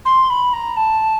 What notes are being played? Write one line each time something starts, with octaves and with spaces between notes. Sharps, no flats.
C6
B5
A#5
A5